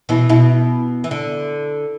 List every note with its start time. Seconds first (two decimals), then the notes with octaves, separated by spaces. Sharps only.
0.09 B2 E3 E4
0.29 B2 E4
1.04 E3
1.11 D3